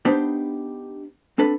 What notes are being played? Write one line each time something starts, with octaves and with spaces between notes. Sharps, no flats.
B3 D4 D#4 G4 B4 C5
C4 D4 A4 B4